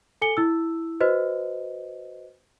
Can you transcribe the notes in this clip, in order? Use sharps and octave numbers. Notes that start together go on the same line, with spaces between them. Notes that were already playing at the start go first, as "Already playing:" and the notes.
A4 G#5 C#7 G7
E4 E6
F#4 B4 C5 D#5